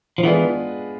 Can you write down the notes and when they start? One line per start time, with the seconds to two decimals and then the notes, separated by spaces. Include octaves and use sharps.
0.18 F3
0.23 E3 G#3 B3 D4 F4 G#4